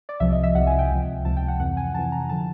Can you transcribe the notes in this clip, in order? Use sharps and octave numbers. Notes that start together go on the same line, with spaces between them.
D5
C2 C3 F3 E5
D#5
E5
C2 C3 F3 F#5
G#5
G5
C#2 C3 F3
C#2 C3 F3 A5
G5
F#5
F2 C3 E3 F#5
G#5
F2 C3 E3 A5
A#5
D3 F3 A5